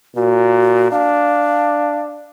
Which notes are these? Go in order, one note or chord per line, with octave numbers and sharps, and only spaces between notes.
A#2 F#4
D4 F5